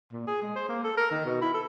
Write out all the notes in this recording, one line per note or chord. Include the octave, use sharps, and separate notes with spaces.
A#2
G#4
G#3
C5
A#3
A4
A#4
D#3
B2
E4
A4